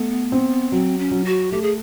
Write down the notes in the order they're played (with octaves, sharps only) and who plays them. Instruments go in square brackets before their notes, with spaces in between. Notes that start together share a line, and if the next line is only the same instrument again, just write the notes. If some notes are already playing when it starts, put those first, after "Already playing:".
Already playing: [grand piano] A3 [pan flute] B3
[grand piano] C4
[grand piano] F#3 [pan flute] C4
[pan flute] C#4
[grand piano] F#3
[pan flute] F#4
[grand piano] A3 [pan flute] G4
[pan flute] G#4